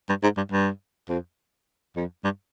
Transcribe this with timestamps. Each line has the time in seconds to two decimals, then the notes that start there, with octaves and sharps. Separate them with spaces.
0.09 G2
0.23 G#2
0.37 G2
0.52 G2
1.09 F2
1.96 F2
2.24 G2